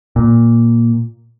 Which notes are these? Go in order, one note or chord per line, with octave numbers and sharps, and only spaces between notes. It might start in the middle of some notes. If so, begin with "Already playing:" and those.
A#2